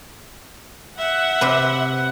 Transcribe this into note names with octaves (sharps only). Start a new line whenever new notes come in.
E5 F#5
C3 B4